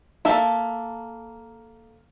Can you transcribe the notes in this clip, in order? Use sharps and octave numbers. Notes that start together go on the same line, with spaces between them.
A#3 A4 E5